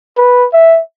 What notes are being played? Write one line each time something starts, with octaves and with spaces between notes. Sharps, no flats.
B4
E5